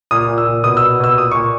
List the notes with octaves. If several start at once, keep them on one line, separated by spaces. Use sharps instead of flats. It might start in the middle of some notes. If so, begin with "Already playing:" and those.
A#2 D#6
A#2
E6
A#2
B2 D#6
E6
B2
B2 E6
A#2 D#6
A#2 C#6